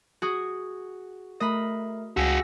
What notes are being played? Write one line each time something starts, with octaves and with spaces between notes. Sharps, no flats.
F#4 G#4
A3 A#4 D#5 B5
C#2 F#4 G#4 E6 A#6